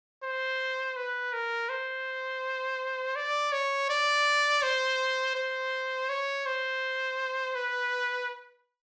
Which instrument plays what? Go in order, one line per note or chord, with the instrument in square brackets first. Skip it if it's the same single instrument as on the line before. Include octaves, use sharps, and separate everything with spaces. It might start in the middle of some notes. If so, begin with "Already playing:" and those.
[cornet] C5
B4
A#4
C5
D5
C#5
D5
C5
C5
C#5
C5
B4